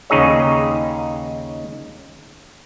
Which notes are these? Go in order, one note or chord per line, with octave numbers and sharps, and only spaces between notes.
D#2 C#3 D#4 G#4 C#5